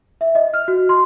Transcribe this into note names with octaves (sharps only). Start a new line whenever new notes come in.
E5
D#5
F6
F#4
C6